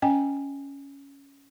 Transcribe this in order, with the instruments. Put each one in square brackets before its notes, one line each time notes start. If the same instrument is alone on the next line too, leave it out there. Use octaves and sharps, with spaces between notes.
[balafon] C#4 D#5 G5 G#5